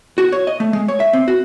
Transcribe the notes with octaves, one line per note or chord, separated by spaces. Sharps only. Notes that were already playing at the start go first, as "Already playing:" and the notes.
F#4
C#5
D#5
A3
G#3
C#5
E5
C4
F#4